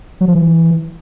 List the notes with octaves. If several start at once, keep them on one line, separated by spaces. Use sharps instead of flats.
F#3
F3
E3